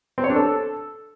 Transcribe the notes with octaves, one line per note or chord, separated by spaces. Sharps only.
C4
C#5
D4
A4